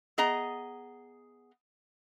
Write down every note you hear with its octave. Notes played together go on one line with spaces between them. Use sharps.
B3 G#4 D#5 A#5